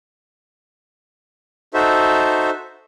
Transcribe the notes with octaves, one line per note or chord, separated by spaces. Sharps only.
D#4 F#4 A4 C5 E5